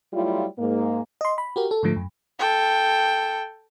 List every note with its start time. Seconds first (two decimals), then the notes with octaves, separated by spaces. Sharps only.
0.13 F#3 G3 A3 E4 F4
0.58 G#2 A#3
1.21 D#5 C6
1.38 B5
1.56 F#4 G4 A#4
1.71 A4
1.83 G#2 D3 F3 A3
1.96 F#2
2.39 A4 G5